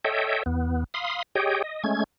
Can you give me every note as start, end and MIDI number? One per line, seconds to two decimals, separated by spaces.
0.04 0.43 69
0.04 0.43 73
0.04 0.43 75
0.04 0.43 76
0.04 0.43 79
0.46 0.84 40
0.46 0.84 59
0.94 1.22 77
0.94 1.22 83
0.94 1.22 84
0.94 1.22 87
1.35 1.62 67
1.35 1.62 68
1.35 1.62 73
1.35 1.62 75
1.35 1.62 79
1.64 1.83 75
1.84 2.04 56
1.84 2.04 57
1.84 2.04 61
1.84 2.04 92